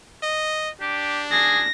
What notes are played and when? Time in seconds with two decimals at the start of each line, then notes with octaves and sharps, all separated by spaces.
0.23 D#5
0.81 D4 G4
1.32 G#4 A#6